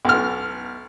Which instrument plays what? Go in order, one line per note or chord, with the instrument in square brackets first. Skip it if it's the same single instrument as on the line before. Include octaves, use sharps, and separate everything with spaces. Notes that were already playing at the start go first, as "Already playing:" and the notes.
[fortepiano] B1 F6